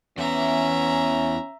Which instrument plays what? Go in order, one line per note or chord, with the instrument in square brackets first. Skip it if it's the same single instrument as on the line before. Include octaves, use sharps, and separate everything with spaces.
[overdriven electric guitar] E2 [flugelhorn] C#4 [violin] E5 A#5